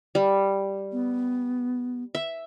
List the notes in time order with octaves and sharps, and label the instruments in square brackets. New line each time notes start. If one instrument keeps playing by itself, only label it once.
[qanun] G3
[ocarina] B3
[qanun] E5